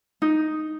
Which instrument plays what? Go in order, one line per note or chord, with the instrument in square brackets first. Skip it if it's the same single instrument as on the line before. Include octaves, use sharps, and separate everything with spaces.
[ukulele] D#4